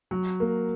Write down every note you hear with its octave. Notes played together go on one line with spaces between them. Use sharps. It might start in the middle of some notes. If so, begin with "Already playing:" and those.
F#3
A#3